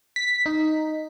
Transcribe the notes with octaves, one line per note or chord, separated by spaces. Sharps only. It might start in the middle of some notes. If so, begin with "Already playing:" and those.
B6
D#4